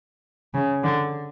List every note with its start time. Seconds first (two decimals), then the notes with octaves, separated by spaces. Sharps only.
0.54 C#3
0.83 D3